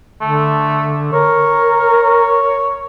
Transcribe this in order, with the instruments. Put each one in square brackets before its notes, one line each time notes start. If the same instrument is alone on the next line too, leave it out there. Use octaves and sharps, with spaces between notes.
[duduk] D3 [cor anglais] A3
[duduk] A#4 [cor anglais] C#5
[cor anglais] C#5